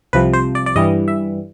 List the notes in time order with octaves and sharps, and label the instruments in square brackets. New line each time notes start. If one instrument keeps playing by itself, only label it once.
[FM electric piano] C2 C3 F3 B4
C5
D5
D5
G2 E3 G3 D#5
E5